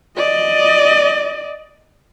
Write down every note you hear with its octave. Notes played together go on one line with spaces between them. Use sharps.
D5 D#5